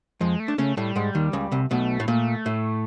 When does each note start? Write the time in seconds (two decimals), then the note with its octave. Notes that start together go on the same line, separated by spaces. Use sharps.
0.21 F2 F3 G#3
0.40 A3
0.48 D4
0.58 C#3 A3 C#4
0.77 A2 G3 A3
0.96 G#2 G#3
1.15 D#2 D#3
1.33 C#2 C#3
1.52 C2 C3
1.71 B1 B2 A3
2.00 A2
2.08 A#2 A3
2.46 A2